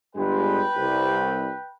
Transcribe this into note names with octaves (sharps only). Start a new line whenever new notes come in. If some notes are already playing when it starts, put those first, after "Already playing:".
G1 G2 G#3 B4 G5
C2